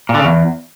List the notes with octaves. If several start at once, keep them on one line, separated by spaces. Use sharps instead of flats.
A#2
D3
C#3
E2